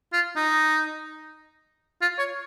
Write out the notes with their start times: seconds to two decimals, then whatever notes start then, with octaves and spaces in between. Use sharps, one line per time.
0.13 F4
0.36 D#4
2.02 F4
2.18 C#5